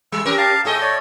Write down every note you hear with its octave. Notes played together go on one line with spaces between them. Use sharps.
G3 E6
C#4 G4 A#4
F5 A5
A2 G#4 A4 D#5
C#5 D5